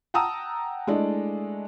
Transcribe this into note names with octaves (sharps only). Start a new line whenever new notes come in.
F#5 G5 A5 A#5 D#6 E6
G#3 A3 D4 E4 D5 D#5